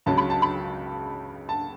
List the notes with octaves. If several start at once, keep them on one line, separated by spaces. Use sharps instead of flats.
C#2 C#3 F#3 A5
B5
A5
B5
A5